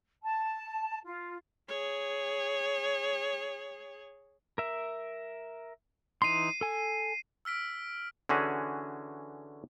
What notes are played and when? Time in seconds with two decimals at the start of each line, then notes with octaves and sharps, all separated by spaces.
0.22 A5
1.05 F4
1.68 G#4 C#5
4.58 A#4 E5
6.22 E3 D#4 C6 C7 D#7
6.61 A4 G#5
7.45 E6 F6 B6 D7
8.29 D3 E3 C#4 F#4 G#4